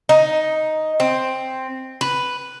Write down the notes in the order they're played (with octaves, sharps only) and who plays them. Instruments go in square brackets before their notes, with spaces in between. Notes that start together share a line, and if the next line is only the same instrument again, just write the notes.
[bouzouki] D#4
C4
B4